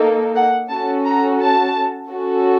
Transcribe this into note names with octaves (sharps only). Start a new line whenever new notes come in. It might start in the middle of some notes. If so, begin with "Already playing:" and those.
Already playing: A#3 D#4 A4
F#5
C#4 F#4 A4 A5
A#5
A5
C#4 F#4 A4